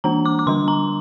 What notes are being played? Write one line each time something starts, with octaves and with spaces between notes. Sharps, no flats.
E3 A#3 D4 A#5
D6
D6
D3 G3 D4 C6
A#5